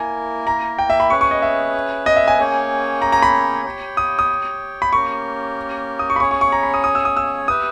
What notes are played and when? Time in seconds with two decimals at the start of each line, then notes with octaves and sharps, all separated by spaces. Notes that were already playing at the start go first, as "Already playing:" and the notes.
Already playing: A#3 E4 A#4 G#5
0.47 A#5
0.79 G5
0.90 E5
1.00 B5
1.10 C#4 G#4 B4 C#6
1.21 C#6
1.31 D#5
1.42 E5
2.06 D#5
2.16 E5
2.28 G#5
2.38 A#3 C#4 G#4 C#5 G5
3.02 A#5
3.12 A#5
3.22 B5
3.65 G4 C#5 G5
3.97 D#6
4.19 D#6
4.82 B5
4.93 A#3 C#4 G4 A#4 C#6
5.99 D#6
6.10 C#6
6.16 B5
6.20 C#4 G#4 C#5 G#5 C#6
6.31 C#6
6.41 C#6
6.52 A#5
6.63 B5
6.74 D#6
6.84 D#6
6.95 E6
7.05 D#6
7.17 E6
7.48 G4 B4 E5 D#6